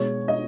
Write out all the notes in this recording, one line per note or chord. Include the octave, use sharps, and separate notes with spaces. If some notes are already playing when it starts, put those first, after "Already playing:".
Already playing: B2 G#3 C#5
D#5